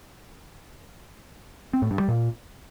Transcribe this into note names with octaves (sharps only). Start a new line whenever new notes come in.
C4
A2
G2
G3
A#2